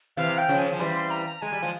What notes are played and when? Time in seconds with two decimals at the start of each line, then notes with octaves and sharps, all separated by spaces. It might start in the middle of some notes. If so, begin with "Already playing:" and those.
0.17 C3 E3 F5
0.38 G5
0.49 C#3 F3
0.58 G#5
0.72 F3
0.79 E3 G3 C6
0.95 C6
1.11 A#5
1.27 A#5
1.42 G#3 G#5
1.53 G3
1.62 F3 G#3